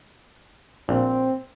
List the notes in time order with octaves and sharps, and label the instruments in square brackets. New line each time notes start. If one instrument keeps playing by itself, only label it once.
[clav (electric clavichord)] A#1 [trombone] C4